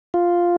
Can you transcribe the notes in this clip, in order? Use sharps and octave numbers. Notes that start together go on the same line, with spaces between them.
F4